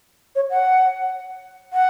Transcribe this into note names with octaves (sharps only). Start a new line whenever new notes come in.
C#5
F#5
F#5